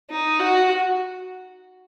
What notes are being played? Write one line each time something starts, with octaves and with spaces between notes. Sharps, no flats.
D#4
F#4